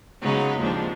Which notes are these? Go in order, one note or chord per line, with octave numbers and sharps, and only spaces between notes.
C#3 F#3 G#3 B3 D#4
D#2 G#2 F3 C4 D4